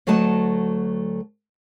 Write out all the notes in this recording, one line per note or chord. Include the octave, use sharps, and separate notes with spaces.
D2 F#3 A3 F#4 D#5 A5